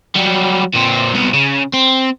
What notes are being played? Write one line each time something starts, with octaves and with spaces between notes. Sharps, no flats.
F#3 G3
A#2 C4
C2 B2
C#3
C4